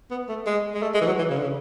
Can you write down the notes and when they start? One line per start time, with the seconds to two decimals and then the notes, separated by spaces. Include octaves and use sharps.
0.11 B3
0.29 A3
0.46 G#3
0.74 G#3
0.82 A3
0.94 G#3
1.01 E3
1.07 F#3
1.18 E3
1.30 C#3
1.38 D3
1.42 C#3